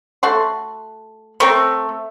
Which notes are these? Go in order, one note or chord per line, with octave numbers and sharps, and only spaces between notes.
A3 F#4 C6
A3 C4 A#4 C5